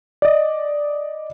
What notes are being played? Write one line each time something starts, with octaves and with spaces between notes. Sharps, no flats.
D5 D#5